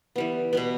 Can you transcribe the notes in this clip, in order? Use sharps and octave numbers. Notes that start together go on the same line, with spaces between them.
E3 G3 B3
B2 G3 B3